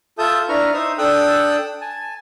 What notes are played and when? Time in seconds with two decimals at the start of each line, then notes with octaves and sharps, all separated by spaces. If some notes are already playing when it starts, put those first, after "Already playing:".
0.18 F4 A4 E5 A5 D#6 G6
0.49 D4 E4 B4 A#5 C#6 F6
0.74 D#4 C5 E5 D#6
0.98 D4 A4 G5 D#6 E6 F#6
1.81 G#5 A5